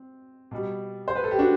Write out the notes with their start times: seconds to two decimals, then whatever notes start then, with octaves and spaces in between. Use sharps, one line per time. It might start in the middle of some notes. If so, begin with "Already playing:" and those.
Already playing: C4
0.51 B2 G3
1.08 C5
1.15 B4
1.24 A4
1.31 G4
1.39 D4 F#4